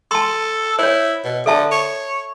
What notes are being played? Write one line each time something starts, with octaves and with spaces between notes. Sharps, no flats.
A4 A5 C6
E4 C5 C#5
B2
D3 A4 E5 A5
C#5